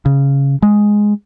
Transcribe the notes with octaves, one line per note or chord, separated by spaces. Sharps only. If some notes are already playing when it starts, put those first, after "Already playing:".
C#3
G#3